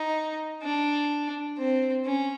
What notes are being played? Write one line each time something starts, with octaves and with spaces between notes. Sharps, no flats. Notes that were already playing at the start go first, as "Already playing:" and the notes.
Already playing: D#4
D4
C4
C#4